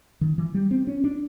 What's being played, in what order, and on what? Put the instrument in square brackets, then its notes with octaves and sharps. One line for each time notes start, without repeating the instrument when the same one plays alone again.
[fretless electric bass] D#3
E3
G3
C4
C#4
D4